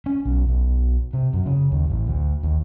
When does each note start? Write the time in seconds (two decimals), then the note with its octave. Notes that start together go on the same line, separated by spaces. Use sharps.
0.06 C#4
0.25 B1
0.48 B1
1.13 C3
1.33 F#2
1.46 C#3
1.72 D#2
1.90 A1
2.07 D2
2.43 D#2